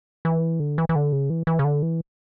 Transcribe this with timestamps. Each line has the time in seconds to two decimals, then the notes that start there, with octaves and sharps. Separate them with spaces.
0.25 E3
0.60 D3
0.78 E3
0.89 E3
0.96 D3
1.12 C#3
1.30 E3
1.47 E3
1.59 C#3
1.64 D3
1.82 E3